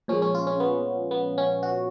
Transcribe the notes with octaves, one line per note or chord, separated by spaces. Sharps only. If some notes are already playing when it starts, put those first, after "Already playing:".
A#2 F3 G#3 C#4
C#4
F4
C#4
B3
B3
C#4
F#4